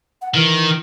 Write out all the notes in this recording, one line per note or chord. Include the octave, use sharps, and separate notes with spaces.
F#5
D#3 E3